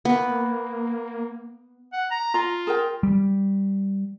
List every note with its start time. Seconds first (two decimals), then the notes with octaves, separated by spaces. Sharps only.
0.05 A#3 B3
1.93 F#5
2.11 A#5
2.34 F4 A#5
2.67 G#4 A#4 G5
3.03 G3